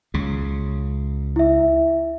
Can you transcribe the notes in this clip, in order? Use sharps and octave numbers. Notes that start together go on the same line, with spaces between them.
C#2 C#3
E4 E5